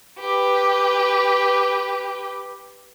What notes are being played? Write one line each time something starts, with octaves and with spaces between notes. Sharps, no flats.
G4 B4